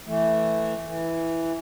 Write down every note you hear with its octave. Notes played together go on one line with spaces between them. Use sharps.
E3 A3
E3